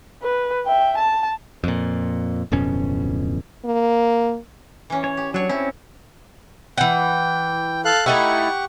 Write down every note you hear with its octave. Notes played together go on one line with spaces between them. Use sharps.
B4
E5 G5
A5
F2 A#2
D1 F2 B2 C#4
A#3
E3 C#4
C#5
G4
F#3 D4 C#5
C4 C#4 E4
E3 F#5 G5
A4 F5 F#6
A3 D#4 E4 G4 F#5 C#6